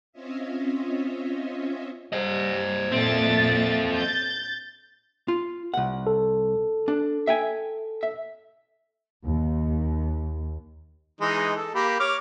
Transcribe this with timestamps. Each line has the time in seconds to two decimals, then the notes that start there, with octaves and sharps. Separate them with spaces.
0.12 C4 C#4 F4 C#5 D#5 E5
2.13 G3 C5 D#5
2.92 A#2 C4 A4 E5 A6
3.95 G6 A6
5.28 F4
5.74 C2 F#5
6.07 A4
6.88 D4
7.27 E5 G5 G#5
8.03 E5
9.25 D#2
11.21 E3 G#3 D#4
11.56 A4
11.75 A#3 G4 B5
12.00 C#5 D6 F6